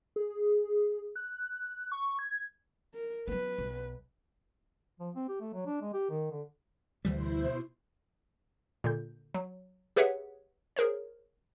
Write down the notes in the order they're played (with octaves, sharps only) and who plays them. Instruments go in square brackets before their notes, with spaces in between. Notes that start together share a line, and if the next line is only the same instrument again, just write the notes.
[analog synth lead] G#4
F#6
C#6
G#6
[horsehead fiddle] A#4
[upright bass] F#3 B3 [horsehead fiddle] B4
[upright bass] B1
[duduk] F3
C4
G4
A3
F#3
D4
G#3
G4
D#3
D3
[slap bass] D2 E3 G3 [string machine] B2 E4 C5
[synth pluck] A#2 D3 G6
F#3
G4 G#4 B4 C#5 E5 F#5
G#4 A#4 C5 C#5